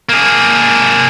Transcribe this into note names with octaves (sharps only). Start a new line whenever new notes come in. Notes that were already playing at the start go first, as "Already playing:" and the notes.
A#3 G#4